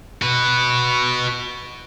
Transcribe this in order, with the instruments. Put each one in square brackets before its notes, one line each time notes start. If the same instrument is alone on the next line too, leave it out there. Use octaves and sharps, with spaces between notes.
[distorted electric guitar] F#4 B4